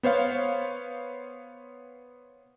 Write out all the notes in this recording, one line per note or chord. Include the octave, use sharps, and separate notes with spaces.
B3 C5 C#5 F5